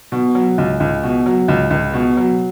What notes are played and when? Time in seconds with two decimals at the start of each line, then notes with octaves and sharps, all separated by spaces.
0.12 B2
0.35 F#3
0.58 C#2
0.80 C#2
1.03 B2
1.26 F#3
1.48 C#2
1.70 C#2
1.94 B2
2.17 F#3